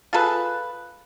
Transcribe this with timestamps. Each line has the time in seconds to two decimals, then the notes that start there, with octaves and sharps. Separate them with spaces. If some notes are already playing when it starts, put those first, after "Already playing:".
0.13 F4 G#4 A4 B4